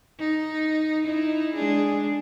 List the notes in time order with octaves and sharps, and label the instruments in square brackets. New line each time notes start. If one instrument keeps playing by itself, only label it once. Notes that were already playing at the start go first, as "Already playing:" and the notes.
[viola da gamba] D#4
D#4 E4
G#3 D4 G#4